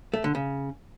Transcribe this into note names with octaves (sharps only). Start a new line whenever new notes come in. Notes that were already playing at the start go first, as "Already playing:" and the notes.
A3
D3
C#3